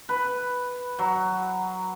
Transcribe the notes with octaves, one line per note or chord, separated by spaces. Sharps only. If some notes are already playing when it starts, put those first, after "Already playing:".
B4
F#3